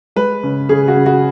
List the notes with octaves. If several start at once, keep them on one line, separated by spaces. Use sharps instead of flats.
G#3 B4
C#3
C#3 G#4
F#4
C#3
F#4